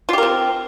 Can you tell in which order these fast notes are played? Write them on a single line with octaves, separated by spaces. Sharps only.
F4 G4 A#4 C4